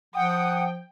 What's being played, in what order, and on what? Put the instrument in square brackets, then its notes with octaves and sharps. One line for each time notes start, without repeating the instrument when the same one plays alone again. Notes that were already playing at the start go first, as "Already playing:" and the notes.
[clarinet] F3 [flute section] F#5 [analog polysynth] G5 [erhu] D#6